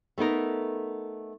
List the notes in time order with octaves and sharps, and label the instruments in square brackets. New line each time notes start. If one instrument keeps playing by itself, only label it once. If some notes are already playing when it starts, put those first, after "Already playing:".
[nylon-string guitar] A3 B3 D#4 A#4